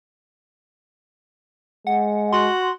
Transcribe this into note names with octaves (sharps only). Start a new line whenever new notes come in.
G#3 F#5
F#4 C6